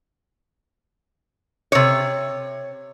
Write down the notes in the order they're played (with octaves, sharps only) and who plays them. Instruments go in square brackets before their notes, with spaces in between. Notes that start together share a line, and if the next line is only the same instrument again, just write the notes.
[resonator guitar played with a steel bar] C3 C#5